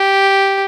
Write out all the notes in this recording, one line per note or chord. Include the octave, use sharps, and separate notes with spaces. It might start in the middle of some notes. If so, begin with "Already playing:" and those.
Already playing: G4